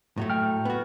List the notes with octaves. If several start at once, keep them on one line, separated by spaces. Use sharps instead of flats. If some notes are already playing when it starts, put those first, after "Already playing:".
A2 F#3 A3
G5 F6
B3 F#4